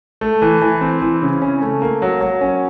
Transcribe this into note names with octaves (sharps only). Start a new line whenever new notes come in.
A3
E3
E3
C4
E3
C#3
C#4
A3
A#3
F#3
F#3
C#4